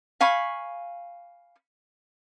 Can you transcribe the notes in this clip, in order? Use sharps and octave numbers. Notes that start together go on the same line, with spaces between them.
F5 G#5 B5 C#6